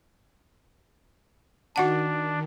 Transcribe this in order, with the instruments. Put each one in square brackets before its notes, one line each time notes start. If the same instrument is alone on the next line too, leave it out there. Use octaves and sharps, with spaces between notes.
[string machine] D#3 [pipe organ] D4 [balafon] F#4 F#5 A5